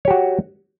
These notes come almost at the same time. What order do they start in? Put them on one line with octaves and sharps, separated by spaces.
C#5 G4 F#4